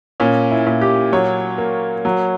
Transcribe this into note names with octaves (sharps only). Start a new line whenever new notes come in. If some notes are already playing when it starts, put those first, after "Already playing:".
A#2 C#4
E4
A#2
G4
F#3 C#5
A#3
F#3